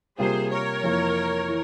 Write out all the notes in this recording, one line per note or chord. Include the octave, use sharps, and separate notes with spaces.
C3 G3 A#3 F4 G#4 C5
A#4 C#5
F2 E3 A#3 F4
E3